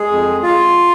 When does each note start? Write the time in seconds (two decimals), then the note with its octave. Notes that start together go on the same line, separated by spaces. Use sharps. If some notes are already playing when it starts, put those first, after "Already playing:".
Already playing: G#3 G#4
0.11 F2
0.43 F4